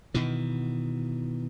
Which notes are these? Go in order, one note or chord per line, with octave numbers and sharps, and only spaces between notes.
B2 D#3 E3